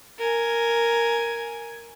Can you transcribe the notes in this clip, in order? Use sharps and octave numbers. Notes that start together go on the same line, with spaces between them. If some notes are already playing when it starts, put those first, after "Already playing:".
A#4 G#5